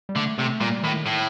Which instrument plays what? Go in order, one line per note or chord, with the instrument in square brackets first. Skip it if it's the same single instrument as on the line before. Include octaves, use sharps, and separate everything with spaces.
[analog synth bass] G3
[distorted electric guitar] D3 [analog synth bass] A3
[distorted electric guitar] C3 [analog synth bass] A3
[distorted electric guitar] A#2 [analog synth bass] G3
[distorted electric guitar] A2 [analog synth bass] D#3
[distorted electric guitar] A2